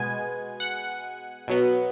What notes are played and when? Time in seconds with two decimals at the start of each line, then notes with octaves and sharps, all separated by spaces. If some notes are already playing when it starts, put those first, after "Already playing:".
Already playing: B2 G#3 B3 G#5
0.60 F#5
1.48 B2 F#3 B3